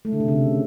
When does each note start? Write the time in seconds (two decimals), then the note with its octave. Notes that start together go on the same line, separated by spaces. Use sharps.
0.05 A3
0.13 D3
0.20 C3
0.28 C#3